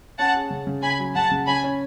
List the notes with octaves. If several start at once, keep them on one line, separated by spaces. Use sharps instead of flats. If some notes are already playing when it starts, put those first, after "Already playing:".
C#4 F#5 A5
G#4
C#3
C#3
C#4 G#5 B5
F#3
C#3 F#5 A5
C#3
C#4 G#5 B5
C#4